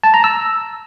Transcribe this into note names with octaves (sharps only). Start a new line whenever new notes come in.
A5
A#5
E6